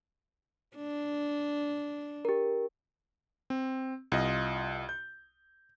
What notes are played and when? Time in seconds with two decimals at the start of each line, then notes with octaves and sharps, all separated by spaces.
0.76 D4
2.25 G4 A#4
3.50 C4
4.12 C2 F4 D#5
4.89 G6